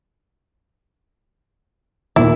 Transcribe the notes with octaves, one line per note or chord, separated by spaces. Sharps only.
D#2 A#2 E4